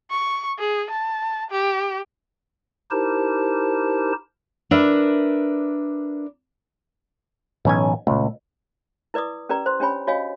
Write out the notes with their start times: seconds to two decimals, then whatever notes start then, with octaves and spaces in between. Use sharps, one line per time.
0.11 C#6
0.59 G#4
0.91 A5
1.51 G4
2.91 D#4 E4 G4 A#4 C5 A5
4.71 D4 A#4 B4 D5 E5
7.65 B1 A2 E3 C#4 G#5
8.07 C#2 A#2 A3
9.14 E4 B4 D5 D6 D#6
9.49 C#4 G4 B4 D5 A#5
9.66 C5 C6
9.80 C#4 D4 G4 C#5 G#5 B5
10.07 F#4 C#5 D#5 F5 G#5